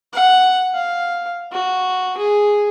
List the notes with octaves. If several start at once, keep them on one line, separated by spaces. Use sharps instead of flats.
F#5
F5
F#4
G#4